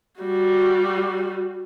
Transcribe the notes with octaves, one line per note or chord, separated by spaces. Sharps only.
G3 F#4